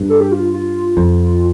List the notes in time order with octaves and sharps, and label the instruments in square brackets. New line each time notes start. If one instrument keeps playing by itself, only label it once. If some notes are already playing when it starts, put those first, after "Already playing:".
Already playing: [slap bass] G2
[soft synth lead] A4
G4
F4
F4
[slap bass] F2